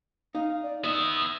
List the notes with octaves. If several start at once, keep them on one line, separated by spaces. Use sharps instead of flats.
D#4 F5
D5
B3 D#5 E5 D#6